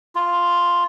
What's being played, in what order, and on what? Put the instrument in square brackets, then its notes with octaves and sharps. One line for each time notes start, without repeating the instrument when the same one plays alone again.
[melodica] F4